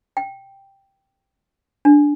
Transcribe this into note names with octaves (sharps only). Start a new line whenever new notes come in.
G5
D4